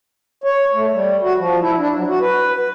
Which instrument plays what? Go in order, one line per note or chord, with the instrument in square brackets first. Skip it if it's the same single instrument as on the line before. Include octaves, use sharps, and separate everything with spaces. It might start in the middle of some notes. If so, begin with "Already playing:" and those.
[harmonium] C#5
A3
G3
F#4
F3
E4
D4
F#3
F#4
B4
B4